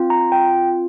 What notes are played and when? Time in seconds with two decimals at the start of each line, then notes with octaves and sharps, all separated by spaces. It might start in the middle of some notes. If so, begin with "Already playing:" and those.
Already playing: C4 F4
0.10 A#5
0.32 G5